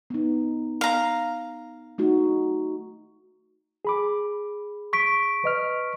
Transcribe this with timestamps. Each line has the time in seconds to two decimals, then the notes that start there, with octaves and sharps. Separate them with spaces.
0.10 B3 D#4
0.81 F5 A#5
1.98 A3 D#4 F#4
3.85 G#4 B5 D6
4.93 C#6 B6 D7
5.44 B4 D#5 F6